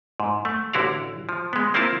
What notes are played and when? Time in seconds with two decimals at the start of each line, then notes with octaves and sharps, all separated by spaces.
0.20 G#2
0.45 A3
0.73 A1 D3 E4 F#4 D5 F5
1.29 F3
1.53 G#3 B3
1.74 A#3 C4 E4 F4 A#4 A5